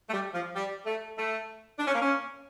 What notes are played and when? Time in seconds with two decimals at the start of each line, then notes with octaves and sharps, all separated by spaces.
0.09 A3
0.13 G3
0.34 F3
0.55 G3
0.86 A3
1.18 A3
1.79 D4
1.87 C#4
1.95 A#3
2.02 C#4